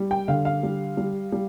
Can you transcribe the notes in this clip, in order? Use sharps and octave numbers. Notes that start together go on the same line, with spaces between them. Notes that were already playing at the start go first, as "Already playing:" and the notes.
Already playing: G3
G5
D3 F5
F5
G3
G3
G3